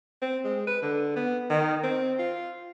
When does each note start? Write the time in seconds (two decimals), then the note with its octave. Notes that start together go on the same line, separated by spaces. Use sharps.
0.22 C4
0.45 G#3
0.67 B4
0.82 D3
1.16 B3
1.50 D#3
1.84 C4
2.19 F4